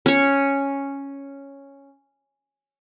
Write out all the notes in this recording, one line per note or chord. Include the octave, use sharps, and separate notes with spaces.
C#4 C#5